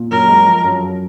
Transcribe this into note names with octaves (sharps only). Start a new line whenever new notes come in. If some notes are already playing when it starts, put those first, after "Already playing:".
Already playing: A#2
F#2 A#4
G#3
F3
F#2
F#2